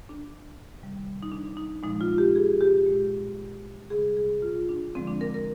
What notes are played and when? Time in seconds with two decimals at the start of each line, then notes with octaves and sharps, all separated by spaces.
0.09 D4
0.79 C3 D#3 G3
1.23 D#4
1.32 D4
1.57 D#4
1.83 A#2 F3 G#3 D#4
2.01 F4
2.18 G4
2.36 G#4
2.61 G4
2.86 A#2 G#3
3.90 C3 G3 G#4
4.17 G#4
4.42 F4
4.69 D4
4.95 D3 F3 G#3 C4
5.07 D4
5.21 A#4
5.34 A#4